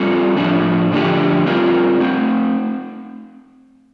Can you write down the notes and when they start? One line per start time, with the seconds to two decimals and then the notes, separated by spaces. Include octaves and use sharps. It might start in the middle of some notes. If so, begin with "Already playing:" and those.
Already playing: G3 C4 F4 A4
0.37 A2 F3 A3 D4
0.92 D3 F3 A3 D4 G4
1.46 G3 C4 F4 A#4
2.00 A3 C4